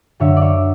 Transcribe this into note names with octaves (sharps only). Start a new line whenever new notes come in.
F#2 D3 F#3 C#5 E5
D5
C#5 E5